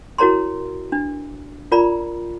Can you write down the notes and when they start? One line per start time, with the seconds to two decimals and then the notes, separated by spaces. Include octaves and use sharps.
0.18 E4 F#4 A#4 C#5 A#5 C6
0.92 D4
1.72 F4 A#4 D5 A#5 B5